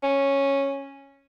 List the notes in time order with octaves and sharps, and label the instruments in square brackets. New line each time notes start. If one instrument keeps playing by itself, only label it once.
[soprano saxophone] C#4